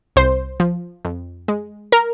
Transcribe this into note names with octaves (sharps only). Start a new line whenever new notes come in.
C2 C5
F3
F2
G#3
A#4